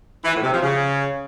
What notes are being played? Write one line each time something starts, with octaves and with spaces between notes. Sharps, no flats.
E3
A2
C3
F3
C#3